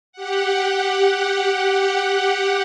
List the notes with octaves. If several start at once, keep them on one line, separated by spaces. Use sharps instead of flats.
G4 F#5